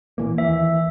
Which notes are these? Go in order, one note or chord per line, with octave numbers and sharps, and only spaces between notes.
A#2 E3 A#3
D#2 E3 E5